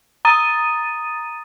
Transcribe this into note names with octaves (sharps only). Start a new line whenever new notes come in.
A#5 D#6 A6 D#7